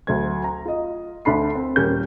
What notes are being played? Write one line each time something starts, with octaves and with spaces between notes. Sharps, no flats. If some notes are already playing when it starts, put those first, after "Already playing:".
D2 F#3 C5 G#6
A#5
F4 D#5
D2 D4 A4 B5 C6 C7
C4
D#1 G3 C#4 A#4 G6